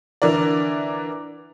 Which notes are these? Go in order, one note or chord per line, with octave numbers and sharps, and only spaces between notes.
D3 E3 A#4 D5